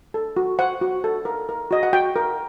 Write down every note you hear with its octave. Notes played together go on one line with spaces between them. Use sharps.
A4
F#4
C5 F#5
F#4
A4
A#4
A#4
F#4 D#5
F#5
F#4 G5
A#4